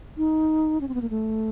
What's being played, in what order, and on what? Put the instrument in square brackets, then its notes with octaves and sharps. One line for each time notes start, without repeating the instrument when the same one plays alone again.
[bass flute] D#4
C#4
C4
B3
A#3
A3